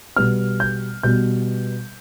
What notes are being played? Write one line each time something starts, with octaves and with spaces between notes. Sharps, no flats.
B2 G3 B3 F6
G6
B2 G3 B3 G6